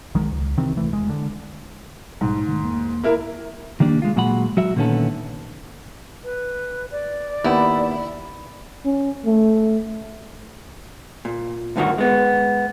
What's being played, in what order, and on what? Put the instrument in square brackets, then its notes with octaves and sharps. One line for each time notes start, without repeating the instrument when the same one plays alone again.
[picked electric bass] B1 D#3 F#3 G#3
C#2
C3 D#3 E3 C4
D1 E3 A3
E1 G#3
D3
[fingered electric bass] A#1 B2 G3 [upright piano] G#2
[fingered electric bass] D#3 A3
E1 A#3
[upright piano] A#3 E4 A#4
[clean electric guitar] D#3 G3 A#3 D4
G#3 F4
A#2 F#3 G#3 F#5 B5
F#3 F#4 E5
A#2 D3 D#3 B3 C#4 A4
[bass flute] B4
D5
[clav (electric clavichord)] D#2 B3 G5 [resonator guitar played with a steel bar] E4
[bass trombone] C#4
A3
[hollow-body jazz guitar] A#2
D2 G2 A#2 D#3 A#3 F#4
G#3 B3